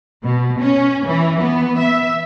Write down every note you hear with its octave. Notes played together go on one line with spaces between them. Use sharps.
B2
C#4
E3
B3
E5